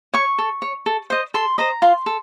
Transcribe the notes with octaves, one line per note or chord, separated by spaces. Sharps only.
C#5 C#6
A4
C#5
A4
C5 D#5
A4 C6
C5 D#5 A#5
F4 C6
A4